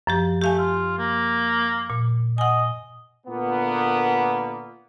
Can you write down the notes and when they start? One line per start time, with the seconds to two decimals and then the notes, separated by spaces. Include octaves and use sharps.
0.07 F#2 F3 G4
0.42 A3 G4 F5 G#5
0.58 F4
0.98 A#3
1.90 A#2
2.38 D#5 F#5 G#5
3.25 A#2 D3 A#3 B3